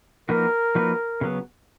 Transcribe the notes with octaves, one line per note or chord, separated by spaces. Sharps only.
F3 A#3 D#4 F#4 A#4 B4
F3 A#3 D#4 F#4 B4
C#3 F#3 B3